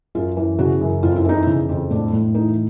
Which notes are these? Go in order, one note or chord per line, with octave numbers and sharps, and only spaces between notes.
F#2 F4
E3
C#3 F#4
F#2
F2 F4
E4
E3 D#4
C#3 E4
F2
A2 D4
A2
E3 D#4